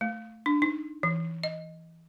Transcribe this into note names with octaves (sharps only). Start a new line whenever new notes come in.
A3
D4
D#4
E3
D#5